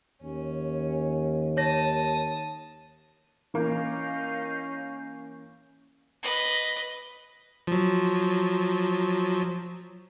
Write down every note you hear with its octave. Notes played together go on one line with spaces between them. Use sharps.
D#2 C#4
C#5 A5 D#6 A#6
E3 A#3 C#4 D#4 F5 G6
B4 D#5
F3 F#3